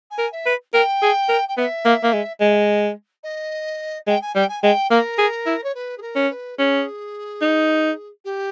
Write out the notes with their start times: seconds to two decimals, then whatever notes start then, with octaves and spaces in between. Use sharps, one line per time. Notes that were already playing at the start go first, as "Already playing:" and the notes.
0.11 G#5
0.18 A#4
0.32 E5
0.46 B4
0.74 A#4 G5
1.02 G#4
1.29 A#4
1.49 G5
1.57 B3 E5
1.85 A#3
2.04 A#3
2.13 G#3
2.40 G#3 D#5
2.50 E5
2.59 D#5
3.24 D#5
4.07 G#3 G5
4.22 G#5
4.35 G3 G5
4.49 G#5
4.62 G#3 G5
4.91 A#3 A#4
5.18 G#4
5.46 E4
5.64 C#5
5.75 B4
5.98 G#4
6.02 A#4
6.16 C#4
6.30 B4
6.58 C#4 G#4
7.41 D#4
8.25 G4